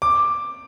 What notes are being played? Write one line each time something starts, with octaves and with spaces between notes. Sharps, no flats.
D6